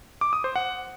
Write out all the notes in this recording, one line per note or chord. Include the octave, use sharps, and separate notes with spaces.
D6
D#6
C5
F#5